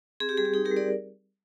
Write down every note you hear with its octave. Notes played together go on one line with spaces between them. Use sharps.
C4 G#4
G4
G3 G#4
G4
D#4 G#4
G4 A#4
G3
A#4 D5